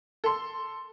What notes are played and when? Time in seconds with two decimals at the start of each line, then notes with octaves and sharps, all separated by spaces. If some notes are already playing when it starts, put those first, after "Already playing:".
0.24 A4 C6